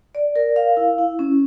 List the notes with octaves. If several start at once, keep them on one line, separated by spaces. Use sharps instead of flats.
D5
A#4
F5
E4
E4
C#4